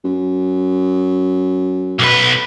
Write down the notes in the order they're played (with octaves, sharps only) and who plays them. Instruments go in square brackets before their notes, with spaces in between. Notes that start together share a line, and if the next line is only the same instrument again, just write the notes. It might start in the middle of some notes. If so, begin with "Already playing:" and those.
[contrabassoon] F#2
[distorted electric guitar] B1 B4